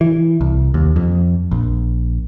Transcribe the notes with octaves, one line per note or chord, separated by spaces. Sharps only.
E3
C2
D#2
F2
A#1